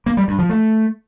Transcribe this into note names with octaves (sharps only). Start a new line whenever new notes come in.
A#3
G3
G2
F3
A3